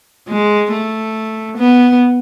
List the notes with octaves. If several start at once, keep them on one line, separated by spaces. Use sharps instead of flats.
G#3
A3
B3